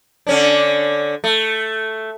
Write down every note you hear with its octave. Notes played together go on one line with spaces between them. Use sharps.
D3 C#4 D4
A3